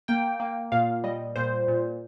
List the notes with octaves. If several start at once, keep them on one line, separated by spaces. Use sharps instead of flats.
A#3 G5
A#3
A#2 F5
G3 D#5
A#2 C5
A#2